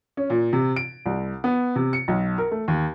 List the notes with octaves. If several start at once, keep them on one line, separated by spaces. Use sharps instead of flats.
C#4
A#2
C3
D7
C2
B3
C3
C#7
B1
A#4
A3
D#2